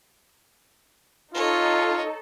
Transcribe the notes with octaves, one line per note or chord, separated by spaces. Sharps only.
D#4 F4 A4 C#5 D#5